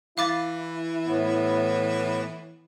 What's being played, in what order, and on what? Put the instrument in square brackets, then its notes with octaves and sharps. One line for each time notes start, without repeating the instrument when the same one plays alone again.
[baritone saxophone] E3 [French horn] E4 [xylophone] F5 D6 A6
[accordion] A2 B3